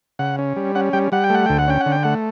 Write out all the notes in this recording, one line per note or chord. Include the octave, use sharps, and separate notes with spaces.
C#3 F#5
C#4
G3
C#4 F#5
G3 G5
G3 F#5
G5
A3 F#5
D2 G5
F#5
C#4 G5
F#5
D3
G5
A3 F#5